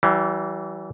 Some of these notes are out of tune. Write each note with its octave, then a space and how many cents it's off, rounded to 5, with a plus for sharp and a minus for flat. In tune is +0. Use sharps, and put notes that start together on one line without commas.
E3 +0 G3 -40